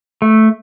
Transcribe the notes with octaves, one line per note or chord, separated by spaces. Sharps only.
A3